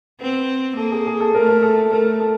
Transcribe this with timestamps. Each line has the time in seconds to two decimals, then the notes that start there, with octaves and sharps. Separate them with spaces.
0.21 B3 C4
0.77 A#3 A4
0.92 G#4
1.07 G#4
1.21 A4
1.35 A3 A#4
1.49 A#4
1.63 A4
1.91 A3 A#4
2.20 A4